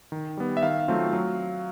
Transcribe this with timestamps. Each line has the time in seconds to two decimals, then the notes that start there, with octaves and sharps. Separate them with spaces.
0.12 D#3
0.37 G3 B3
0.57 E5
0.63 D#3 F5
0.88 F#3 A3 C4 F4
1.13 F#3